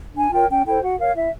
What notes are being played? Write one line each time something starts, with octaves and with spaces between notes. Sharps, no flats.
D4 G#5
F4 A#4 C#5 G5
C#4 G5
E4 A4 C5 G5
F#4 F#5
A#4 C#5 F5
E4 E5